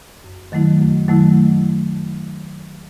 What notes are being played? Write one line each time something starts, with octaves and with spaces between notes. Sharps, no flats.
F#2
D#3 F#3 A3 E4
F#2
D#3 F#3 A3 E4